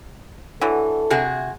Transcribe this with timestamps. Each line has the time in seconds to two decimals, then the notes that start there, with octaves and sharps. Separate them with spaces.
0.61 D3 E3 F#3 A4
1.10 C3 F#4 G#4